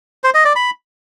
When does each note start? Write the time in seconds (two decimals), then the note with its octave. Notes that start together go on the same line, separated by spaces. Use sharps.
0.24 C5
0.34 D#5
0.45 D5
0.56 B5